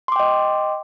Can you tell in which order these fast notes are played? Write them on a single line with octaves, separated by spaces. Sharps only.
C6 D6 G5 D#5